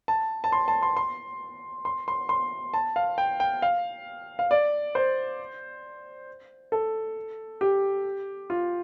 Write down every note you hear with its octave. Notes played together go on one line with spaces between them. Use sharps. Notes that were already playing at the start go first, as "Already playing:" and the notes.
A5
A5
C6
A5
C6
C6
C6
C6
C6
A5
F5
G5
G5
F5
F5
D5
C5
A4
G4
F4